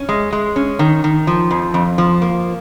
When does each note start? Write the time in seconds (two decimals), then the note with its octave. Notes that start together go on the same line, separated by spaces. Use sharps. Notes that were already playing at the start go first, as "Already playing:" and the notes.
Already playing: C#4
0.09 G#3
0.32 G#3
0.56 C#4
0.79 D#3
1.04 D#3
1.27 F3
1.51 F2
1.74 F2
1.98 F3
2.22 A#3